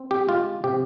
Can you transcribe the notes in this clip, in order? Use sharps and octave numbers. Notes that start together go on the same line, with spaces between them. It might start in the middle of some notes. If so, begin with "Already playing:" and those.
Already playing: C4
G4
G#3 F4
C3 G4